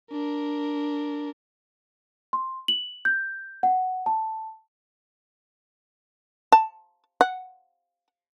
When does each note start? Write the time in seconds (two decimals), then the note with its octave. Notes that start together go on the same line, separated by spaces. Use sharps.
0.12 D4 A#4
2.33 C6
2.68 F#7
3.05 G6
3.63 F#5
4.06 A5
6.52 A5
7.21 F#5